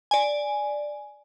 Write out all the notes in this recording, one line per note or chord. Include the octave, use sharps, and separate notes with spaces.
D5 G#5